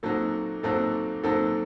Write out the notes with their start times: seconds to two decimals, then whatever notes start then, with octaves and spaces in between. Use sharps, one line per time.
0.03 A#2 F#3 C4 D#4 F#4 A4
0.63 A#2 F#3 C4 D#4 F#4 A4
1.23 A#2 F#3 C4 D#4 F#4 A4